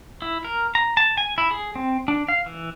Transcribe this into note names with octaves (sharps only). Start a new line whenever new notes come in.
E4
A#4
A#5
A5
G#5
E4
G#4
C4
D4
F5
E3